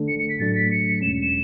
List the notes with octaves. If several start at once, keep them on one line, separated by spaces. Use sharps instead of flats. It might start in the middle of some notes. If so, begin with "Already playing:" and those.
Already playing: D3 A3 D4 A4
C#7
C#7
B6
A2 F#3 A3 D4 A6
B6
C#7
E2 B2 G#3 C#4 E7
E7